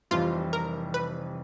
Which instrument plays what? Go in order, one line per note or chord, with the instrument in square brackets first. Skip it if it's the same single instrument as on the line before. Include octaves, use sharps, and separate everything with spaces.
[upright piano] F1 F2 C3 E3 G3 [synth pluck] F4
[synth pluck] A#4
B4